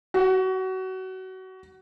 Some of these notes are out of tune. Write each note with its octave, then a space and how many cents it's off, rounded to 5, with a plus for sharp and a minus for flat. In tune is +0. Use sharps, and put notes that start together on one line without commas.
F#4 +25